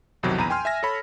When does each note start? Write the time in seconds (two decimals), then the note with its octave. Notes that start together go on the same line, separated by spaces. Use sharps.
0.23 B1 F2 C3 D#3 F#3
0.37 A#1 E2 A#5 B5 D#7
0.50 G5 G#5 C6 F6
0.65 E5 G#5 A#6
0.83 A4 C#5 B5